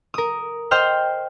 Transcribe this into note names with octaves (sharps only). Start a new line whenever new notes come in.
A#4 D#6
C5 D#5 G5 F6 G6